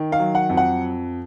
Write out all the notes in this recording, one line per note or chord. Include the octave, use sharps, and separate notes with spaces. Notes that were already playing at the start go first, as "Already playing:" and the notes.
Already playing: D#3
F5
F#3
F#5
F2
F#5